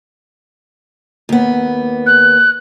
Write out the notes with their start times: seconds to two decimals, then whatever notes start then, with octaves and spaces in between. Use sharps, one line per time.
1.29 D#2 B3
2.06 F#6